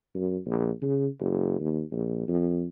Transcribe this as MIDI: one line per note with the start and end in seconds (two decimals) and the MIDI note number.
0.15 0.38 42
0.46 0.71 34
0.82 1.07 49
1.20 1.58 30
1.60 1.82 39
1.92 2.24 34
2.28 2.66 41